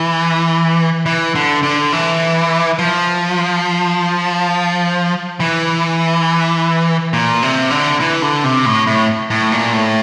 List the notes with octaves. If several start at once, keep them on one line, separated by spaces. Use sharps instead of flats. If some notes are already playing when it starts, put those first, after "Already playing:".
Already playing: E3
E3
D3
D3
E3
F3
E3
A#2
C3
D3
E3
D3
C3
A2
A2
A2
A#2
A2